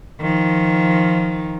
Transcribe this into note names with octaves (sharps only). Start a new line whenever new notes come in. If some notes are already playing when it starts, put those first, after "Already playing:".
D#3 F3